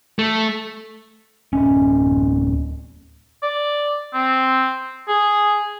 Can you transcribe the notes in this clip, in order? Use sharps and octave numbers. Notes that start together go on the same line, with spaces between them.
A3
D1 C#4
D5
C4
G#4